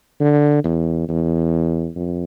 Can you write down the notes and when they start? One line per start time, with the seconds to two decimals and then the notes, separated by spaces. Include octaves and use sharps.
0.20 D3
0.64 E2
1.08 E2
1.96 F2